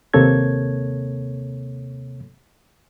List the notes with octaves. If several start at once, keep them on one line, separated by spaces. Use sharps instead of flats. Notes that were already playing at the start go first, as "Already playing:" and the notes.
D#2 C3 A#3 A4 C#5 G#6